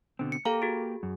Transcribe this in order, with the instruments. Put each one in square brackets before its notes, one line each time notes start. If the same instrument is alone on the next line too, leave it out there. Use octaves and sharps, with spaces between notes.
[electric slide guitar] B2 D3 C4
[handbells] C#7
[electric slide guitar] A#3 G4 [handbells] A4 F5 A#5
[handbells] F#4 G#4
[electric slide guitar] F#2